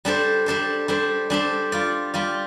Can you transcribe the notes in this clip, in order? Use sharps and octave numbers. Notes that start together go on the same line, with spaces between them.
G3 D4 A4 C5
G3 D4 A4 C5
G3 D4 A4 C5
G3 D4 A4 C5
G3 F4 D5
G3 F4 D5